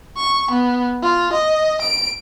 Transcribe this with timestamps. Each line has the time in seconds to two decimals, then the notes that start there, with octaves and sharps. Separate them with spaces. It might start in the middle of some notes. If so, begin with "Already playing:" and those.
0.17 C#6
0.51 B3
1.02 F4
1.33 D#5
1.82 D7